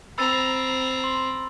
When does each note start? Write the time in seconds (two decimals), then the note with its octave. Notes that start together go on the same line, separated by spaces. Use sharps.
0.18 C4 A#5 B5 E6 A6
1.04 C6